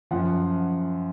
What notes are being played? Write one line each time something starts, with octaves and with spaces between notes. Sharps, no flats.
F#2 F3 F#5